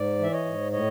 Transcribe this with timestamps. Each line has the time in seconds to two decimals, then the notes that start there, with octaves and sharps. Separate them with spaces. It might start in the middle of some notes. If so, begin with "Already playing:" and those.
Already playing: G#2 D5
0.19 E3 E5
0.32 C#5 D#5
0.45 G#2
0.72 A2 C#5 D#5